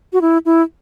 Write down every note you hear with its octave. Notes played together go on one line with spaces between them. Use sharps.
F#4
E4
E4